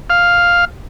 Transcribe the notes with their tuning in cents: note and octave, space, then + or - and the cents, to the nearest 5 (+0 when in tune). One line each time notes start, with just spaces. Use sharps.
F5 +5